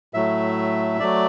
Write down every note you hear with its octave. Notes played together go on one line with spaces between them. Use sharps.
A2 F#3 A3 E5
F#3 A3 D5